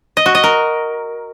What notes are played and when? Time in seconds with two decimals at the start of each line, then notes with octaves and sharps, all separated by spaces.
0.17 D#5
0.26 F#4
0.35 D#5
0.44 A#4